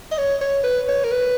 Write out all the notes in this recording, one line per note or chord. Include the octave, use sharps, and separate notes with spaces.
D#5
C#5
C#5
B4
C#5
A#4
B4